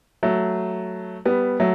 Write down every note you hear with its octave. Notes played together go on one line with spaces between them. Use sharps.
F#3 A3
G3 B3
F#3 A3